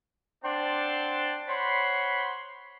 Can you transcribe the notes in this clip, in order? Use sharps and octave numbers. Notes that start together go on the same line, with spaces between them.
C4 D4 D5 F#5 A5 C6
C5 C#5 F#5 B5 C6